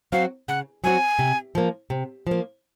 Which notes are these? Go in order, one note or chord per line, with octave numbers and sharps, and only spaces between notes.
F#3 C4 F#4 F5
C#3 F#5
F#3 C4 F#4 G#5
C3
F3 A#3
C3
F3 A#3